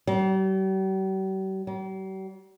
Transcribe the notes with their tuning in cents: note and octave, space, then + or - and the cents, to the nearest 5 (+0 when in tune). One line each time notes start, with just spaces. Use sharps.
G3 -45
G3 -45